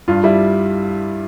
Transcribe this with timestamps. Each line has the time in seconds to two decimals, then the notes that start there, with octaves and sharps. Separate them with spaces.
0.08 G2 F4
0.24 G3 E4